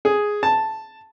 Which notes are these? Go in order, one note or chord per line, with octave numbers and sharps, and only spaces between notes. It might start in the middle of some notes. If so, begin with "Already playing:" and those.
G#4
A5